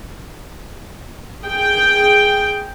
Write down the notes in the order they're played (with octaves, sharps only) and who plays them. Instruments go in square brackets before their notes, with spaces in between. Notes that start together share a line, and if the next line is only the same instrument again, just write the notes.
[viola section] G#4 G5